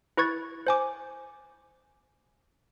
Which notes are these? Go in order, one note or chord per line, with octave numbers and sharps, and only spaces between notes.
E4 B4 C#6 G#6 A6
C5 G#5 D6